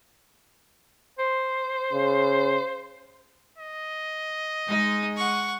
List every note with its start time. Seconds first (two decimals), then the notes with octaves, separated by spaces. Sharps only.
1.19 C5
1.92 C#3
3.58 D#5
4.69 G#3 D#4
5.17 F#5 C#6